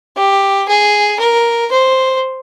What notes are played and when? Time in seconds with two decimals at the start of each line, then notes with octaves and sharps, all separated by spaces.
0.17 G4
0.69 G#4
1.20 A#4
1.72 C5